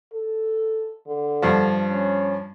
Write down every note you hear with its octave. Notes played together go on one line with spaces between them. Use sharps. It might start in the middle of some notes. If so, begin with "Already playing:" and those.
A4
D3
G2 F3
C#4